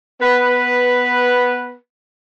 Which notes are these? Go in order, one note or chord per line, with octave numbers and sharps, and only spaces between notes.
B3 B4